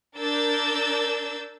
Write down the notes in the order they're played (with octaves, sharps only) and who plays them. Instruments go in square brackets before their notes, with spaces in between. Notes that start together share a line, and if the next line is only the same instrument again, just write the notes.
[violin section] D4 A#4 E6 G6 A6